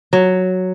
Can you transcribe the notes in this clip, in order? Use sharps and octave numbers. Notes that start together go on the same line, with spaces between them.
F#3